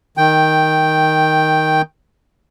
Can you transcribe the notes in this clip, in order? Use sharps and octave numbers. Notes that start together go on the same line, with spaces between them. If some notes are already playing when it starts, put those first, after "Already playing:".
D#3 G5